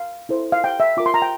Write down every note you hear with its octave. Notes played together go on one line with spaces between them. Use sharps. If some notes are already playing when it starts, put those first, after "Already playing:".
Already playing: F5
E4 A4 C5
F5
G5
E5
F4 A#4 D6
C6
A#5
G5